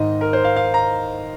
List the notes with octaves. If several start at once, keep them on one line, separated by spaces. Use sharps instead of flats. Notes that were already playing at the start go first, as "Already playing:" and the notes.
Already playing: G#2 D#3 D#5
A#4
C5
F5
F5
A#5